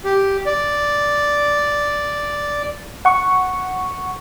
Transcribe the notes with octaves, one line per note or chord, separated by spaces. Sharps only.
G4
D5
F#5 C#6